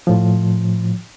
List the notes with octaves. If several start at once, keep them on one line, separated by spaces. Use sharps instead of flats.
A2 F3